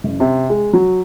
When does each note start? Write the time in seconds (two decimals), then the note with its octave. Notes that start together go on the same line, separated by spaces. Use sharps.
0.04 F#1
0.20 C3
0.50 G#3
0.73 F#3